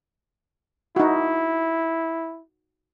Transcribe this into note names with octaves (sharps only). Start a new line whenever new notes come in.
D#4 E4 F#4